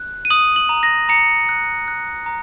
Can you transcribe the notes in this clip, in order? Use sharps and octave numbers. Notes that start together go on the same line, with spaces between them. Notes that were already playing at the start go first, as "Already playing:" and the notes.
Already playing: F#6
D#7
D#6 F#7
F#7
A#5
A#6
A#5 C#7
F#6
F#6
A#5